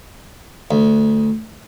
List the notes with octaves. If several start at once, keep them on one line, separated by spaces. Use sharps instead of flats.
D2